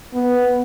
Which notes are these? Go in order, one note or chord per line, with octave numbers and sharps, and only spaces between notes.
B3